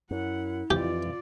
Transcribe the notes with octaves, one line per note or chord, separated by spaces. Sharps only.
F#2 E4 F#5
F2 E3 F4 G4 D5